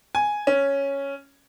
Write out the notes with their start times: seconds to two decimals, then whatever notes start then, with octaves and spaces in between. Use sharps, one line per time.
0.15 G#5
0.47 C#4